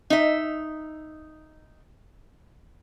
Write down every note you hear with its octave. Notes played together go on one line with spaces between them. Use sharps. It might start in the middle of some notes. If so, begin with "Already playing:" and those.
D#4 E5